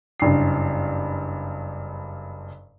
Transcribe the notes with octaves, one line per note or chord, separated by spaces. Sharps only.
F#1 G2 C7